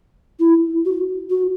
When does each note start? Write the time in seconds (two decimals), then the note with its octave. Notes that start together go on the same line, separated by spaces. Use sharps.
0.40 E4
0.85 F#4
1.30 F#4